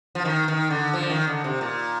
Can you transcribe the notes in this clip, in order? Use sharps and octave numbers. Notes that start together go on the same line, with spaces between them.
F3
D#3
D#3
D3
F3
D3
D#3
D3
C3
A#2